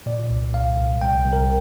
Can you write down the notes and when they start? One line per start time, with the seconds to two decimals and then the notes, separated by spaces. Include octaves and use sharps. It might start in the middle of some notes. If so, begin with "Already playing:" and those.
0.06 A#2 D5
0.30 C2
0.53 C2 F5
0.78 C2
1.01 C2 G5
1.24 C2
1.33 A#4